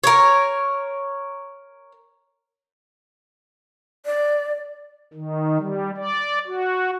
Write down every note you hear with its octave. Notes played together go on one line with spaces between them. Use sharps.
A#4 C#5
D5
D#3
G3
D5
F#4